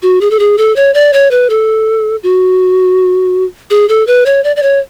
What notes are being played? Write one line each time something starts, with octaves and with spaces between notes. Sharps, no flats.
F#4
G#4
A4
G#4
A4
C#5
D5
C#5
B4
A4
F#4
G#4
A4
B4
C#5
D5
D5
C#5